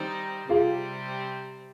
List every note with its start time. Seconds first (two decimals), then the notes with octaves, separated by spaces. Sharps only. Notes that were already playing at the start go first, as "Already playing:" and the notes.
Already playing: D#3 G3 C4 D#4
0.49 C3 G3 C4 F4 G#4